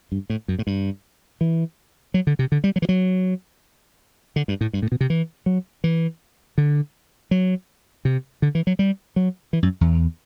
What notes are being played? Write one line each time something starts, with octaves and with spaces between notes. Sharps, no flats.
G2
A2
F#2
A2
G2
E3
F#3
D3
C3
D3
G3
F#3
E3
F#3
D3
G2
A2
G2
A2
B2
C3
E3
F#3
E3
D3
F#3
C3
D3
E3
F#3
G3
F#3
E3
F#2
E2